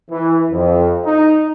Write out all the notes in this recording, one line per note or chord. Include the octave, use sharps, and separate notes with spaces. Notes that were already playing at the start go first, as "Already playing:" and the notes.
E3
F2
D#4